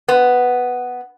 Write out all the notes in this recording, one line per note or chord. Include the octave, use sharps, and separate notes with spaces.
B3